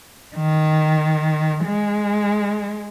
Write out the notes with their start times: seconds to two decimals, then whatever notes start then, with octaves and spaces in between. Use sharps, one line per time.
0.36 D#3
1.65 G#3